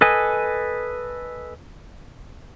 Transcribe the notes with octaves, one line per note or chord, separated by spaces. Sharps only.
A4 B4 D#5 G#5